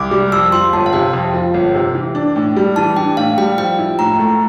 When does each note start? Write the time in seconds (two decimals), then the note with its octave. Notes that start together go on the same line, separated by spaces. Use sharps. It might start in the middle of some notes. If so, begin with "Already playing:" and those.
Already playing: C2 D6
0.11 G3
0.32 F2 E6
0.52 F3 C6
0.72 G1 A5
0.86 F5
0.93 C3 G5
1.13 F2
1.34 F3
1.54 G1
1.75 C3
1.95 E3
2.15 D4
2.36 A2
2.56 G3
2.76 E3 A5
2.96 D4 G5
3.17 A2 F5
3.38 G3 G5
3.58 F3 G5
3.79 E4
3.99 A2 A#5
4.19 A3